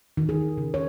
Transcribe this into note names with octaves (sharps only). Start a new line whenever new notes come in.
D#3
G#4
C#3
C#5